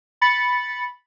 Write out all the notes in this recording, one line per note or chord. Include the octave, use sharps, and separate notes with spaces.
B5 A6 C#7